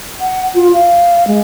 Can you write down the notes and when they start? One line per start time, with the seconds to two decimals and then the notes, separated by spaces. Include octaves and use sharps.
0.20 F#5
0.55 F4
0.74 F5
1.27 G#3